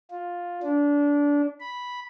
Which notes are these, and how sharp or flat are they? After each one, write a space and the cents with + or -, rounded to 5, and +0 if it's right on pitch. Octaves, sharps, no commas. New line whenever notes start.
F4 +10
D4 -25
B5 -5